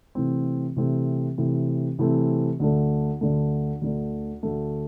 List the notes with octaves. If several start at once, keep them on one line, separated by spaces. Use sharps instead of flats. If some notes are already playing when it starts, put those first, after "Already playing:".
C3 E3 A3 C4
C3 E3 A3 C4
C3 E3 A3 C4
C3 E3 A3 C4
D2 D3 A3
D2 D3 A3
D2 D3 A3
D2 D3 A3